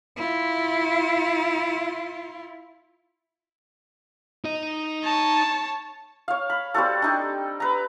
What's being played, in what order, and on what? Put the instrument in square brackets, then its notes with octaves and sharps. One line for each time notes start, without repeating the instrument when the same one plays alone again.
[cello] E4 F4
[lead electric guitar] D#4 D#5
[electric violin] C#5 A5
[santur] C#5 F5
B5
G3 C4 F#4 A4
D4 D#4 G4
B4 A#5